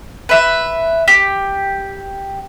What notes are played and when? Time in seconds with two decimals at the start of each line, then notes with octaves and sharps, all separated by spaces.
0.29 B4 E5
1.08 G4